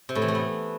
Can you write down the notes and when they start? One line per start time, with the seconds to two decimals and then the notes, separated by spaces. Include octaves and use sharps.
0.09 C3
0.15 A2
0.22 E3
0.28 A3
0.35 B3